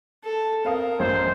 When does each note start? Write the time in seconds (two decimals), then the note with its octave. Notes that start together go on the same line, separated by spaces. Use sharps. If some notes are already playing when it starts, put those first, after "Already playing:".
0.24 A4
0.65 C4 A#4 F5 D#6
0.99 A1 F#2 F3 C5